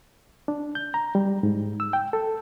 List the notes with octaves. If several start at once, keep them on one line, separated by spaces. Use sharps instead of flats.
D4
G6
A#5
G3
G#2
E6
G5
A4